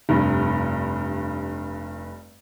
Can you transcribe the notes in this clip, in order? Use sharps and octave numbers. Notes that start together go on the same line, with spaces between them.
F1 G2